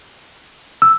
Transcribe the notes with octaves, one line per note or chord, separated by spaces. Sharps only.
E6